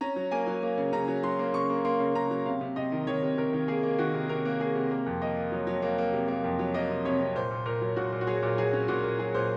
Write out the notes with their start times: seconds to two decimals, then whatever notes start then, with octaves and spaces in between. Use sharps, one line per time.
0.01 C#4 A#5
0.16 F#3
0.31 A#3 G#5
0.47 F#3
0.63 A#3
0.78 C#3
0.93 C#3 A#5
1.08 F#3
1.23 F#3 C6
1.39 A#3
1.54 C#3 C#6
1.70 A#3
1.85 A#3 C6
2.00 C#3
2.15 C#3 A#5
2.30 F#3
2.46 C3 F5
2.61 C3
2.76 C3 D#5
2.92 D#3
3.07 D#3 C#5
3.22 C3
3.37 C3 A#4
3.53 D#3
3.68 A#3 G#4
3.83 A#3
3.98 D#3 F#4
4.14 C3
4.29 C3 A#4
4.45 A#3
4.60 A#3 G#4
4.75 C3
4.91 A#3
5.06 F2
5.22 A#3 D#5
5.37 A#3
5.52 F#3
5.67 F#3
5.82 A#3
5.98 A#3
6.13 C3
6.28 A#3
6.44 F2
6.59 F#3
6.74 A#3 D#5
6.90 C3
7.05 C3 C#5
7.20 C3
7.35 A#2 C5
7.51 A#2
7.65 A#2 A#4
7.81 F#3
7.96 A#2 F#4
8.12 A#2
8.21 F#4
8.27 F#3 G#4
8.42 A#2
8.58 F#3 G#4
8.73 C#4
8.88 A#2 F#4
9.04 A#2
9.19 F#3 G#4
9.34 A#2 C5